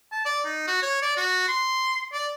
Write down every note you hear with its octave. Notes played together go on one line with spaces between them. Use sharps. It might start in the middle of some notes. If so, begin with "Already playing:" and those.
A5
D5
D#4
F#4
C#5
D5
F#4
C6
D5